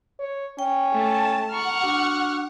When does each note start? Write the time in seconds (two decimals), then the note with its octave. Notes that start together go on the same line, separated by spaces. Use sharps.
0.20 C#5
0.59 C#4 G5
0.93 A3 A5
1.51 F#5 A#5 C#6 F6
1.84 D4 F#4